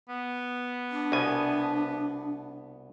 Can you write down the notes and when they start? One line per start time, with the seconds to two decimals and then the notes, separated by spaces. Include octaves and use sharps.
0.09 B3
0.91 D4
1.12 C2 B2 G#5